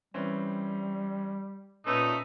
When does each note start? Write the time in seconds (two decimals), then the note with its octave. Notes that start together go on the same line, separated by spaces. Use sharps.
0.14 E3 G3 C4 C#4
1.86 A#2 A3 B3 C#4 D#4 B4